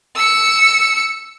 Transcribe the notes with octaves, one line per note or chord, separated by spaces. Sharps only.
E6 C#7